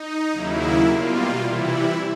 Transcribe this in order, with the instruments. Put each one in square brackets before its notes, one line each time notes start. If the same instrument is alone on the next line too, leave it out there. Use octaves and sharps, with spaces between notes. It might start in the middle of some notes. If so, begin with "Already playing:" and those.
Already playing: [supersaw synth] D#4
D#2 C#3 F#3 A#3 E4
B2 G3 A#3 F4
C3 E3 G3 E4